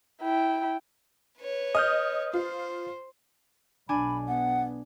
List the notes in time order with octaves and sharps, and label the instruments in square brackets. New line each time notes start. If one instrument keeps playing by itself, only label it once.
[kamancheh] E4 G5
[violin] B4 C#5
[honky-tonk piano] D#5 [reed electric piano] D#6 F6 G6
[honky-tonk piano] F4 [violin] C5
[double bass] B1 [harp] D4 G#5 [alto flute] B5
[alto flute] B3 [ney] F#5